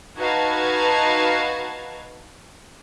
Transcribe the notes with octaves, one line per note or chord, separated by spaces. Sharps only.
D#4 F#4 B4 F5 A5 G#6